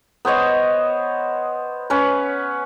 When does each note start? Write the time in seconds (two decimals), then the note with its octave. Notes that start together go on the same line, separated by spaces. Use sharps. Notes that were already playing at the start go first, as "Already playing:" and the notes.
0.25 B3 C5 C#5 D#5
1.90 C#4 B4